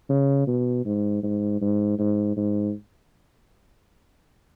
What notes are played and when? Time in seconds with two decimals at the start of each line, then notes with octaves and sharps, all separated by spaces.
0.10 C#3
0.47 B2
0.85 G#2
1.23 G#2
1.62 G#2
1.99 G#2
2.37 G#2